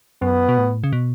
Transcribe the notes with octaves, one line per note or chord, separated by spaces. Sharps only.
F#2 B3
B2
A2
C#3
B2